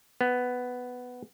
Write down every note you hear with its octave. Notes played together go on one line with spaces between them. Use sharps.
B3